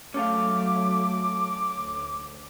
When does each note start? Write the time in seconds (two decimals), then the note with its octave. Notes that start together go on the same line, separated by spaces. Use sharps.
0.14 F#3 A3 C#4 A4 F5 D6
1.78 D2